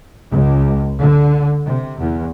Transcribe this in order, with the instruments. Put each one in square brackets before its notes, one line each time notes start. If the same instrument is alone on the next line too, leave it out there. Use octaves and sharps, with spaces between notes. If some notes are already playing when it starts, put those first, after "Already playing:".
[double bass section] C#2
D3
C3
E2